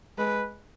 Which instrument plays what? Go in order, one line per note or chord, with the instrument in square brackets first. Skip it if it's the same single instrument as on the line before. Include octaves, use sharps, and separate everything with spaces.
[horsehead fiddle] G#3 [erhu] B4